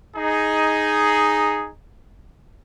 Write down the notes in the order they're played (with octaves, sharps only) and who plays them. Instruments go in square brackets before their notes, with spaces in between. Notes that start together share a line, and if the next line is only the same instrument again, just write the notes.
[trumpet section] D#4 G#4